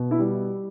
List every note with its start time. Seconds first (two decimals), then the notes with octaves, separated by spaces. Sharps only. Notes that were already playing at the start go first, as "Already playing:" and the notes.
Already playing: B2
0.11 E4
0.19 G3